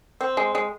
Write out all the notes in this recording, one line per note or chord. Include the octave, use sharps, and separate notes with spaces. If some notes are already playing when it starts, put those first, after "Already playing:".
C4
G#3
G#3